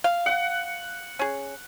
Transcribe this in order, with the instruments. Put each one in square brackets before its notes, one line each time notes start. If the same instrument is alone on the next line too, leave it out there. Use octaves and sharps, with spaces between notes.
[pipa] F5
[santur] F#5
[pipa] C#4 G#4